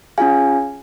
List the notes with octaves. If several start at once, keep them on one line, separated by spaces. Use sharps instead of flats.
C#4 F4 G#4 F5 G#5